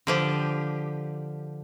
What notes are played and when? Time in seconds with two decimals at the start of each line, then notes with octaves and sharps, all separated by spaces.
0.07 D3 F3 G4